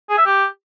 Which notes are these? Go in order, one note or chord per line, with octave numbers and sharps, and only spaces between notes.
G#4
E5
G4